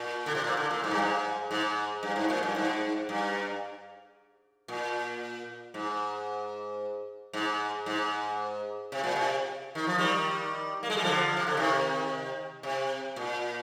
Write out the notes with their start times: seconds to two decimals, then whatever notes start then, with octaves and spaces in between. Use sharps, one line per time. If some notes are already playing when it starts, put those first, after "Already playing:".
Already playing: A#2
0.26 D3
0.35 C3
0.44 A#2
0.57 D3
0.71 A#2
0.84 G#2
0.91 G2
0.99 G#2
1.51 G#2
2.03 G2
2.16 G#2
2.30 A#2
2.43 G2
2.56 G#2
3.09 G2
4.68 A#2
5.74 G#2
7.33 G#2
7.86 G#2
8.92 C3
9.04 A#2
9.16 C3
9.75 D#3
9.87 F3
9.98 D#3 G3
10.83 A#3
10.90 G#3
10.97 G3
11.04 D3 F3
11.37 C3
11.47 D3
11.57 C3 D#3
12.63 C3
13.16 A#2